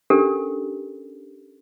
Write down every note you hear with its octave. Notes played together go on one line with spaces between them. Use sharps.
C#4 D4 G4 A4 A#4